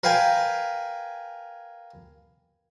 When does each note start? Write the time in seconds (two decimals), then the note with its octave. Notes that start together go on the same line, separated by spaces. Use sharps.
0.04 A#4 B4 F5 G5 G#5